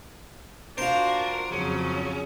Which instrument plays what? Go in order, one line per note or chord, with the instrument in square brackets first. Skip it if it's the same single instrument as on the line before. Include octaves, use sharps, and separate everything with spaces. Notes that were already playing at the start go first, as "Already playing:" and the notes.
[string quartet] D4 F#4 F5 [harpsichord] F4 C5 [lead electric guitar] A#4
[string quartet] F2 C#3 F#3 [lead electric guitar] C#4 [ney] G#4